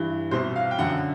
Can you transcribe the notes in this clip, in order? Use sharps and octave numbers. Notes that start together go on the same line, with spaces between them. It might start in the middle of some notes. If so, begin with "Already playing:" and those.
Already playing: G2 E3
C2 B2 C5
F5
G5
F#2 D3 F#5